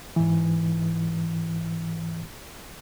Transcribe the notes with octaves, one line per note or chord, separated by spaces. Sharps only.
G#2 E3